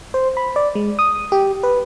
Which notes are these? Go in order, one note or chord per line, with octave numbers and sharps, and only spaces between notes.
C5
B5
D5
G#3
D#6
G4
B4